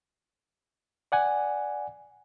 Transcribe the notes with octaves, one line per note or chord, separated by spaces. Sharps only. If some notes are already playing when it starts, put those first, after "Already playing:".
D5 F#5 G#5